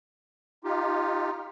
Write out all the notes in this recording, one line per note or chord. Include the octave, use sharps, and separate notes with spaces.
D#4 F4 G4